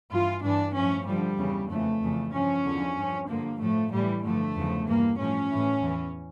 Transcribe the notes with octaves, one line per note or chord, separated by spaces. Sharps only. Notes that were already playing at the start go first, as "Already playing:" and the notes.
G2 E3 F4
G2 E3 D4
A2 F3 C#4
G2 D3 F3 G3
E2 C#3 E3
F2 C#3 E3 A3
F2 C#3 E3
G2 F3 C#4
E2 D3 F3
G2 F3
G2 D3 F3 A#3
A2 F3 A3
A2 E3 G3
G2 D3 F3 A3
E2 C#3 F3
G2 E3 A#3
A2 F3 C#4
A2 E3
E2 E3